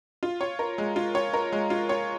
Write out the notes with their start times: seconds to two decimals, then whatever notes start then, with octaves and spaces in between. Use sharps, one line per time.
0.23 F4
0.41 C#5
0.59 A#4
0.78 G#3
0.96 F4
1.15 C#5
1.34 A#4
1.52 G#3
1.70 F4
1.89 C#5